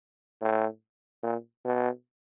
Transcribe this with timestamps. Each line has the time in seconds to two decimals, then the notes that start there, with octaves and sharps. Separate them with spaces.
0.41 A2
1.23 A#2
1.65 B2